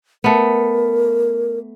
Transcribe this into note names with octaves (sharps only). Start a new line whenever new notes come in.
A3 B3 A#4